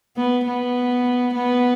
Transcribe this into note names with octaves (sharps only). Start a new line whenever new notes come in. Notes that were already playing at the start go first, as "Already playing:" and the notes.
B3
B3
B3